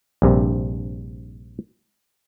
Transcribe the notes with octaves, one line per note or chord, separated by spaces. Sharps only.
A#1 G2 C3